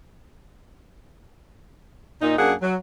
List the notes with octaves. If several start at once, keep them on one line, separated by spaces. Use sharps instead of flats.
A#2 D#4
F#2 A#3 D4 G#4 F#5
F#3